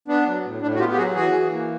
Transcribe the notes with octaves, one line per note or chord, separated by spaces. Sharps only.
B3 D4
F#3
A2
A2 D4
F#4
B3 F4 G4
G4
F#3 F#4 G#4
E3 F#4 G#4
E3
A#3